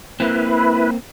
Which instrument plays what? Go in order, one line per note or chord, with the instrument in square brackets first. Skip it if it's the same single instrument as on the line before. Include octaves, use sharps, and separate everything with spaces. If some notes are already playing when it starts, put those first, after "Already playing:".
[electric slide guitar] A#3 C4 [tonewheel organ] E4 B4